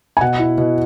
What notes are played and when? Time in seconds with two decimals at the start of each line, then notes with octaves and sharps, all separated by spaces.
0.17 G#5
0.21 B2 F#5
0.39 E4
0.58 B2